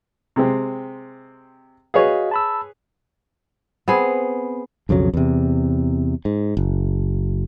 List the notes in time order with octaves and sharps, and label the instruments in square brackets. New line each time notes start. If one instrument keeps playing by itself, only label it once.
[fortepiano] C3 G#3 C4
[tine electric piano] F#4 D#5 F5 [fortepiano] G#4 B4 C#5
[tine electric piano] A5 B5 E6
[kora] B3 C4 G#4
[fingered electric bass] B1 F2 C#3 F#3
E2 C3
G#2
F#1